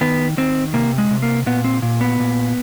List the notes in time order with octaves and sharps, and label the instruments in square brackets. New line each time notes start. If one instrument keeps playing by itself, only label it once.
[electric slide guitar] D#3 B3
D#3 C4
C3 A#3
G#3
C3
A#3
A#2 B3
C4
A#2
B3
A#2